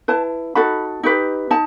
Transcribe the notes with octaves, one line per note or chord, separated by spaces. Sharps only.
E4 B4 A5
D#4 F#4 A4 B5
D#4 G4 B4
D#4 A5